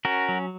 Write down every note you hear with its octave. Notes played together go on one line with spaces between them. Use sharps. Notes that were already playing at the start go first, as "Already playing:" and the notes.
C#4 F#4 A#4
F#3